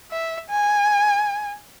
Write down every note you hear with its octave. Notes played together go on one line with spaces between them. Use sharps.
E5
G#5